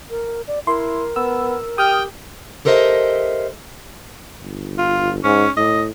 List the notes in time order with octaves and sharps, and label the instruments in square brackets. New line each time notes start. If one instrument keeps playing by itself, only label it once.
[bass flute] A#4
D5
[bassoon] E4 [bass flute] A#4 [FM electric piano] C6
[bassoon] B3 [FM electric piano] E6
[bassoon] G4 [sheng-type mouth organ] G5 [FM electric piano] D#6 F6
[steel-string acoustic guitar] G4 A4 A#4 C5 D#5 E5
[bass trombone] G1
[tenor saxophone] F4
[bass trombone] G#2 [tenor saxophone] C#4
[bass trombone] A2 [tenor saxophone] D#5